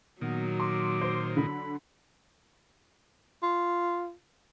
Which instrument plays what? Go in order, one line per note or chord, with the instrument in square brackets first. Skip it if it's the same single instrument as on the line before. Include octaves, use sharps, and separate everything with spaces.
[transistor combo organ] A#2 D#3 [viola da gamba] F#3 [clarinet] B3
[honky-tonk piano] C6 [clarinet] D6
[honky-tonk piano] C5
[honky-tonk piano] D3 [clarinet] B5
[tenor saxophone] F4